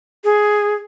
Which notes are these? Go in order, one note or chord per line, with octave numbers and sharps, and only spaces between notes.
G#4